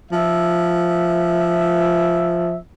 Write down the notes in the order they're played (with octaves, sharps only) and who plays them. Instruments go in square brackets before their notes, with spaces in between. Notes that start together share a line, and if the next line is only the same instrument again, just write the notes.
[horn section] F3 E5